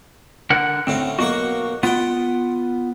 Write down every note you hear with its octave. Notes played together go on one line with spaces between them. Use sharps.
D3 A#4 F#5
D2 A2 C4 C#4
B1 A#3 F#4 C#6
B3 F4 F#5 G5